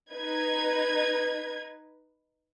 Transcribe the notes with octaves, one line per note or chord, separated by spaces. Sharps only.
D#4 B4 G#6